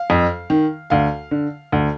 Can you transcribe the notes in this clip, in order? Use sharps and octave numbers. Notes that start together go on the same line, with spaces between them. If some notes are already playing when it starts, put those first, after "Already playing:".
Already playing: F5
F2
D#3
D2 F5
D3
D2